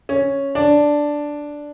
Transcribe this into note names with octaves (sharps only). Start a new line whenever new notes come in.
C#4
D4